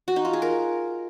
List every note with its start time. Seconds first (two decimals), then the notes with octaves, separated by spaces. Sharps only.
0.08 F#4
0.16 D#4
0.25 F4
0.33 G#4
0.42 A#4